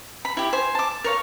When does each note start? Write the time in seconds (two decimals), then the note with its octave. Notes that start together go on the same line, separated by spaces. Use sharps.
0.25 B5
0.37 E4 G4
0.53 C5 G#5
0.75 A5 D6
1.04 A#4 C#5 F5